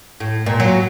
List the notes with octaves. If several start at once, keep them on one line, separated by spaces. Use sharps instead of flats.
A2
A#2
F#3